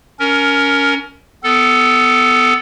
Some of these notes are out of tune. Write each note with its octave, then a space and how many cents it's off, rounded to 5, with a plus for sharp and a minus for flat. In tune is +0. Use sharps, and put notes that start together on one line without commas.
C#4 +25 A#4 +0
B3 +20 A4 +0